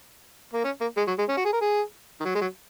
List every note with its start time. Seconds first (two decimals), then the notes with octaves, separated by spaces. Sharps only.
0.54 A#3
0.64 C#4
0.81 A#3
0.97 G#3
1.07 F#3
1.18 G#3
1.29 C#4
1.37 F#4
1.45 G#4
1.53 A#4
1.61 G#4
2.20 D#3
2.25 F#3
2.35 G#3
2.41 F#3